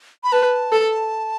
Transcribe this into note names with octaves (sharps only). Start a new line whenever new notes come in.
B5
B4 A5
A4